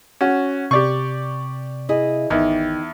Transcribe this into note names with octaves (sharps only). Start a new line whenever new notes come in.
C#4 F#4
C3 G4 D5 C#6
E4 G#4 D#5
G#1 E2 D#3